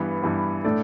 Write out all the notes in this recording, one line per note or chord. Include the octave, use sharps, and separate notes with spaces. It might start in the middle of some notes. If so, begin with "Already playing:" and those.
Already playing: G2 E3 B3
G2 E3 B3
A2 A3 D4 A4 D5